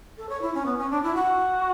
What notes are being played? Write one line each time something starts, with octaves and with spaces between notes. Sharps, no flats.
A4
C#5
E4
C#4
B3
C#4
D4
E4
F#4